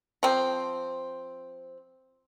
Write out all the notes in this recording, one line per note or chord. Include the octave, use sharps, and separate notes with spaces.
F3 C4